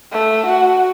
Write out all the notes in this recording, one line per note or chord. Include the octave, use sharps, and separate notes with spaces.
A3
F#4